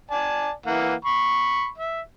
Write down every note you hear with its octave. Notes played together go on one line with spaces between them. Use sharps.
D5 G#5 A5
E3 A#3 F#5
B5 C#6
E5